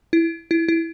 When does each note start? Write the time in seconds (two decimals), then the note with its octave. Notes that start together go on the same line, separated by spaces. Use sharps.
0.13 E4
0.51 E4
0.68 E4